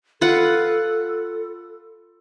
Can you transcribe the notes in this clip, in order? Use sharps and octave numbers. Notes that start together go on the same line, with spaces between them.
F4 A4 B4 F#5